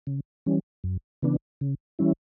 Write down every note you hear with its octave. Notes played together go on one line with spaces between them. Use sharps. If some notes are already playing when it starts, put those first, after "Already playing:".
C#3
E3 G3 C#4
F#2
C#3 E3 B3 D4
C#3
E3 G3 C#4 E4